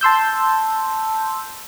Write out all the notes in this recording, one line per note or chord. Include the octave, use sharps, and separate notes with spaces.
A5 C6 E6 G6